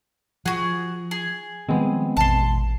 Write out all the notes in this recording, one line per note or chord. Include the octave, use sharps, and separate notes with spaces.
F3 F#4 G#4 F#5
G#4
D#3 F3 G3 G#3 B3 C4
E1 A1 A5 C6